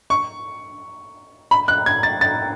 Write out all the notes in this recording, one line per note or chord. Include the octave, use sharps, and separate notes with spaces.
C#6
B5
F#6
G#6
A6
A6